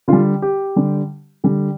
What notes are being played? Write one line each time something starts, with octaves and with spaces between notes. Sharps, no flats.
D3 G3 F4
G4
D3 G3
D3 G3